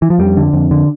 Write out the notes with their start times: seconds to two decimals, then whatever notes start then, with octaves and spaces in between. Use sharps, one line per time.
0.02 E3
0.10 F3
0.19 F2 G3
0.37 D3
0.54 F2
0.71 D3